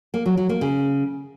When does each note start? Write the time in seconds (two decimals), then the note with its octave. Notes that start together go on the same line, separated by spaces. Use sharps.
0.14 A#3
0.26 F#3
0.37 F#3
0.49 A#3
0.61 C#3